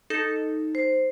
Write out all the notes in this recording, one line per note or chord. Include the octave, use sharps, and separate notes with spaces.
D#4 A4
C5